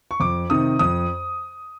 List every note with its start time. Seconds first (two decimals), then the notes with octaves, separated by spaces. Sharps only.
0.11 C#6
0.20 F2 D6
0.50 C3 D#3 D#6
0.79 F2 D#6